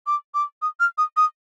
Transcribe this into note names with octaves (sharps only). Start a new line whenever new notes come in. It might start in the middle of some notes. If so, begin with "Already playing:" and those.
D6
D6
D#6
F6
D#6
D#6